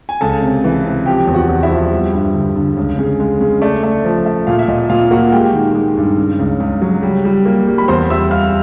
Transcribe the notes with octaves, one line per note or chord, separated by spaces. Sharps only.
G#5
C#2 A4 A5
C3
E3
C3
F3 G4 G5
E2
F#4 F#5
E2
E4 E5
F3
G3
G2
D3
D3
C#2
C#3
G#3
C#3
A3 D5
A3
F3
A3
A#2 F4 F5
E5
A#2 D#5
A#2 F4 F5
A#3 F#4 F#5
G#3 G4 G5
D#3
G#3
G2
C#3
C#2
C#2
F#3
G3
G3
A#3
G3
B5
E2 C5 C6
G3 E5 E6
G3 F5 F6